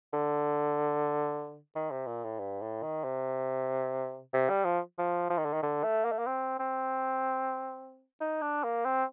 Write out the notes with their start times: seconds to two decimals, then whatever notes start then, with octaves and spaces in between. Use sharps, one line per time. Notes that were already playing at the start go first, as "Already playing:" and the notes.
0.13 D3
1.76 D#3
1.91 C3
2.07 A#2
2.24 A2
2.39 G2
2.62 A2
2.83 D#3
3.04 C3
4.33 C3
4.49 G3
4.65 F3
4.98 F3
5.30 F3
5.38 D#3
5.45 D3
5.53 D#3
5.63 D3
5.83 A3
6.05 A#3
6.12 A3
6.19 A#3
6.27 C4
6.59 C4
8.21 D#4
8.42 D4
8.64 A#3
8.85 C4